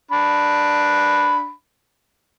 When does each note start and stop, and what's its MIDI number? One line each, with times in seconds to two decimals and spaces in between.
0.11 1.51 62
0.11 1.51 83